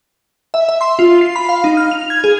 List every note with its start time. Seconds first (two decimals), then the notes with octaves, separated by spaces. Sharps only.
0.54 E5
0.69 E5
0.81 C6
0.99 F4
1.21 C7
1.36 B5
1.49 F5
1.64 D#4
1.77 F6
1.91 F7
2.10 G#6
2.24 G#4